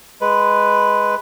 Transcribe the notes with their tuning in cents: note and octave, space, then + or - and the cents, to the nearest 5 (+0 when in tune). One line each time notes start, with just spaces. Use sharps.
G#3 +0 B4 +0